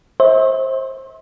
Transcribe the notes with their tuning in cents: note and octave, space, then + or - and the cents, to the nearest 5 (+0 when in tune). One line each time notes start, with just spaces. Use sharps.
C5 +25 E5 -45